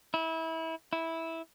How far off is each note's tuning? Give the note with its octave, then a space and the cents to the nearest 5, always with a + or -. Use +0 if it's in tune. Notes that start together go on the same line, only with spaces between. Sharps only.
E4 -25
E4 -10